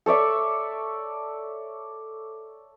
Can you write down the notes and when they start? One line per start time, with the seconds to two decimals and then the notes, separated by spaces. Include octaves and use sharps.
0.06 A4 C#5 D5 E5